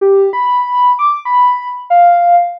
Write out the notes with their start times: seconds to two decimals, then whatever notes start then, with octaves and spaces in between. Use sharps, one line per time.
0.01 G4
0.33 B5
0.99 D6
1.25 B5
1.90 F5